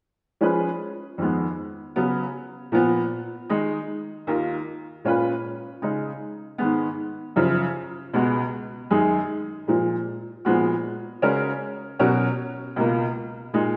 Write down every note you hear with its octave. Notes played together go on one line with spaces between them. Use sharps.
F3 G#3 C#4 G#4 B4
F2 D#3 G#3 B3
C#3 F#3 B3
A#2 F3 B3
D#3 G#3 D#4
D#2 D#3 A#3 F4
A#2 G#3 C#4 F4 B4
C#3 G#3 D#4
G#2 D#3 G#3 B3
F#2 C#3 F3
C#2 B2 G#3 B3 F#4
F#2 D#3 G#3 D#4 G#4
A#2 F3 G#3
A#2 F3 G#3 B3 F#4
C#3 G#3 C#4 F#4 A#4
B2 F#3 C#4 F#4 A#4
C#2 B2 A#3 F4
A#2 G#3 D#4